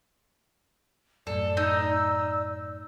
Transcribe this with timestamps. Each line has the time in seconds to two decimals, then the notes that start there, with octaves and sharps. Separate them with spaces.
1.27 F#2 A2 A4 D5
1.57 D#4 E6